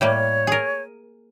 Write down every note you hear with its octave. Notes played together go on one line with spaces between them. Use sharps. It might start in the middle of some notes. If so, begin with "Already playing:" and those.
A2 G3 A#3 C#5
G#4 A#4